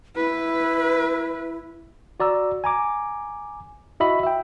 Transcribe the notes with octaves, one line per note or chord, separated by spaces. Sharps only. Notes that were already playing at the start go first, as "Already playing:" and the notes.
E4 B4
F#4 D5 A#5 E6
G#5 A#5 D6
E4 F#4 D#5 E5 B5
E5 G5